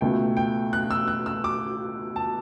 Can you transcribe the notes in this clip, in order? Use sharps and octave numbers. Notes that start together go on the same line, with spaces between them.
C#2 B2 A3 G5
G5
F#6
E6
F#6
E6
D6
A5